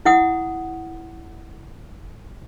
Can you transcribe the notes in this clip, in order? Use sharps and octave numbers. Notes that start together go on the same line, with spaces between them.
E4 F#5 D#6